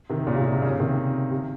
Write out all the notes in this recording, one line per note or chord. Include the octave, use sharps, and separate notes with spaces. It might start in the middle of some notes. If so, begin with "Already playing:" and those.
C3 D#3
A#2 C#3
C3
A#2
C3
A#2 C#3
C3 D#3
C3